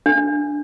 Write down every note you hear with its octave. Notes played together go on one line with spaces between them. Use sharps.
D4